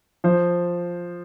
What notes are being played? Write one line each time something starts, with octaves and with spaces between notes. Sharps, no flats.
F3 C5